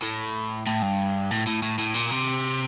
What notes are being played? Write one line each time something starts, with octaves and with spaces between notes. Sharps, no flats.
A2
A2
G2
A2
A2
A2
A2
A#2
C3